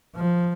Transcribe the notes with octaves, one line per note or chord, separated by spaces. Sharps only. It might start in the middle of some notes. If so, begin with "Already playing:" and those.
F3